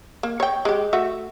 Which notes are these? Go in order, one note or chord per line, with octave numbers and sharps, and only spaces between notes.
A#3
C#5 G5
G#3 G4
A3 F#4 E5